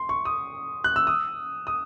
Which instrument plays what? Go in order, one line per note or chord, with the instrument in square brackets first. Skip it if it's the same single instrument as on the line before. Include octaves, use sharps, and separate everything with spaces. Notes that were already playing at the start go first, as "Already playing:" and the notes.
Already playing: [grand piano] C6
C#6
D#6
F#6
E6
D#6
D#6